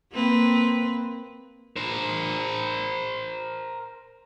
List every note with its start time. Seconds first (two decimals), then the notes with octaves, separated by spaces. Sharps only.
0.12 A#3 C4 B4
1.76 A#4 C5